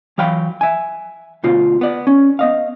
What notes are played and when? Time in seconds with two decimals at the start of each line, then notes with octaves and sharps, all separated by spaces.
0.18 E3 F#3 F5 G5 B5
0.61 E5 G#5
1.44 D2 B2 F4 C5
1.81 B3 D5
2.07 C#4
2.39 B3 D#5 F5